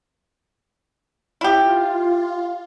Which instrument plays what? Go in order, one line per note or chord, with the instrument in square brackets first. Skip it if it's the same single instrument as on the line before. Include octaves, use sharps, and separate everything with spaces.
[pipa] E4 G4 [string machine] F4